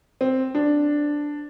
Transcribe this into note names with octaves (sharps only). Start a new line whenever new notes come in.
C4
D4